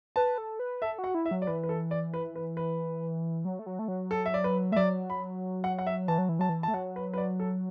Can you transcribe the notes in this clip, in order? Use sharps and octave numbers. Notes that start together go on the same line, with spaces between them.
B4 A5
A4
B4
A4 E5
F#4
F#5
E4
E5
F#3
D5
E3 B4
B4
A4
D5
B4
B4
B4
F#3
A3
F#3
A3
F#3
A4
E5
D5
B4
A3 E5
F#3 D5
B5
F#5
F#5
E5
E3 A5
F#3
E3
F#3 A5
E3
A3 A5
F#3 F#5
B4
B4
D5
A4